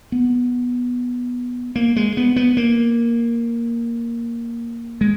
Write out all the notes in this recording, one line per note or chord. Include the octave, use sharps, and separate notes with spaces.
B3
A#3
G#3
B3
B3
A#3
G#3